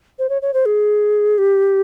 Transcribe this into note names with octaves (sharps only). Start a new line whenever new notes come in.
C5
C#5
C#5
C5
G#4
G4